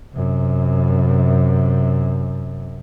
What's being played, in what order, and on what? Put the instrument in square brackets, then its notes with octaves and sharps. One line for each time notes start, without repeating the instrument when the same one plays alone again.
[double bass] F#2 C3